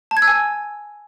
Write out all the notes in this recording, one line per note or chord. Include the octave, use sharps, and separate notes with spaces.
A5
G#6
E6
G#5